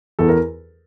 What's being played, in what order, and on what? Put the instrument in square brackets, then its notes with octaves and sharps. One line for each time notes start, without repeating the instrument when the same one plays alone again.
[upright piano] E2 A4
A#4